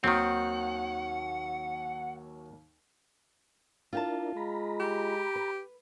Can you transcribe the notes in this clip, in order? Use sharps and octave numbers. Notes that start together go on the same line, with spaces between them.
D#2 D#3 F#3 A#3 C4 F#5
D4 E4 F4 A#4 G5 A5
G#3 A#5 B5
G4
B4